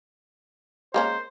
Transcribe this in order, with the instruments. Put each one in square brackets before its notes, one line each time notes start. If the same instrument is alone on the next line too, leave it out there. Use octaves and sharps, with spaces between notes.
[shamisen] G#3 A#3 C#4 [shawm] C5